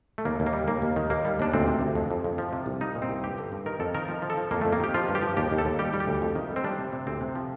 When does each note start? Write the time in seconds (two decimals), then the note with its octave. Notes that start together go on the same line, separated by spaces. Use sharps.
0.18 A3
0.25 D#2 A#3
0.40 D#2
0.47 A#3
0.53 G3
0.68 D#2 A#3
0.82 D#2
0.96 D#3
1.10 D#2 A#3
1.25 G3
1.40 D#2 D4
1.54 D2 C4
1.67 C3
1.82 D2
1.95 F2
2.11 F2
2.24 F2
2.38 F3
2.53 C3
2.66 C2
2.81 G3 D#4
2.95 A#2
3.02 C4
3.09 C2
3.24 G2 G4
3.38 D3
3.52 G2
3.66 D#3 A#4
3.80 F2 A4
3.94 D#3 A#4
4.08 F3
4.22 F3
4.30 A4
4.37 F3
4.51 F2 A#3
4.61 F2 A3
4.73 A#3
4.80 D#3 G4
4.94 F3 F4
5.08 G2
5.15 G4
5.22 F3
5.37 D#2 G4
5.51 D#2
5.58 A4
5.65 D#2
5.79 G3 G4
5.94 G3
6.00 G4
6.07 D2
6.22 F2
6.35 D#3
6.50 G3
6.56 C4
6.64 G3 D4
6.79 C3
6.93 C3
7.07 D2 C4
7.21 C3
7.35 F3